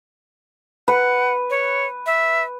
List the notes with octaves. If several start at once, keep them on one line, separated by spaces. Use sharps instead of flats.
B4 F#5
C#5
E5